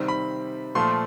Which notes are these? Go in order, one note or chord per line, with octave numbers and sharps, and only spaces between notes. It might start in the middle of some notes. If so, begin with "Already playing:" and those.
Already playing: C3 D#3 G3 C4
B5
A#2 F3 A3 C6